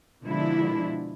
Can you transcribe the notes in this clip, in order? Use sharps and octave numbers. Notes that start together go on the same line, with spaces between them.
B2 D3 F3 G#3 D4 E4